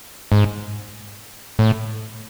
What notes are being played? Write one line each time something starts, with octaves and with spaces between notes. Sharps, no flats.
G#2
A2